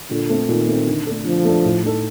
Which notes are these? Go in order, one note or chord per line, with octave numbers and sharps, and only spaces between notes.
A#2 D3
A3 C4
A#2 D#3
A3 C4
D3
A3 D4 A4
D3 F3
A3 D4 A4
A2
A3 D#4 A4